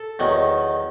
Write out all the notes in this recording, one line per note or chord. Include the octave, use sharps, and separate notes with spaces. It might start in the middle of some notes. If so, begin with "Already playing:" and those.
Already playing: A4
E2 D#3 F#3